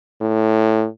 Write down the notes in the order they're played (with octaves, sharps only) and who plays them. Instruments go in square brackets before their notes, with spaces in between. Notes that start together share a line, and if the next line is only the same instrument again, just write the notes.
[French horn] A2